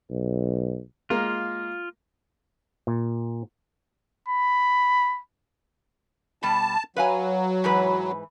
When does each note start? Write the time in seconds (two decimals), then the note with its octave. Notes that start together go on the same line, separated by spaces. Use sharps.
0.10 B1
1.10 G#3 A#3 F4 A#4
2.87 A#2
4.28 B5
6.43 B2 G3 A5
6.96 F#3 B4 F5 G#5
7.64 G#2 E3 B4